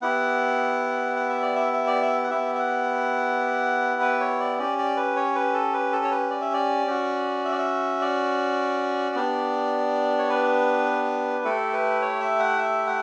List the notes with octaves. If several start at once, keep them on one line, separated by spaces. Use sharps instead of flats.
B3 E4 G4 F#5
F#5
E5
D5
E5
E5
D5
E5
F#5
B3 E4 G4 E5
E5
F#5
B4
C#5
D5
C#4 G4 D5
D5
B4
C#5
B4
A4
B4
A4
C#5
B4
D5
E5
D5
C#4 F#4
E5
D5
E5
D5
B3 D4 G4
C#5
B4
A3 E4 G4 A4
B4
C#5
E5
F#5
E5
F#5